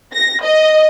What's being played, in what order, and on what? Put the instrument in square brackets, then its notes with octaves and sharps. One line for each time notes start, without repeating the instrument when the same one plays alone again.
[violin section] A#6
D#5